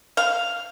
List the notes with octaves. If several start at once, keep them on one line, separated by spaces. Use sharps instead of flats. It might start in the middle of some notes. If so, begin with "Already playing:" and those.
F5